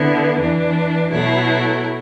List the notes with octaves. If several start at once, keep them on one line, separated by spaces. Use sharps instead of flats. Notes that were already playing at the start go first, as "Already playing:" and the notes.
Already playing: D3 B3 E4
E2 E3 D4
B2 F#3 A3 E4